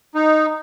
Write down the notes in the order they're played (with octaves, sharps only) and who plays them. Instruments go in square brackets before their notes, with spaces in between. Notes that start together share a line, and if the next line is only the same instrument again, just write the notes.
[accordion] D#4